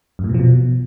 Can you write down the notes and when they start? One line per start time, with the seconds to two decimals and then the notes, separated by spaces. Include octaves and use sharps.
0.19 F#2
0.24 A2
0.29 B2
0.34 F3
0.40 B2